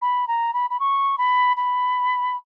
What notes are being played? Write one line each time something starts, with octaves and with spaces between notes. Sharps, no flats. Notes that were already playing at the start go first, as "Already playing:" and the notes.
B5
A#5
B5
B5
C#6
B5
B5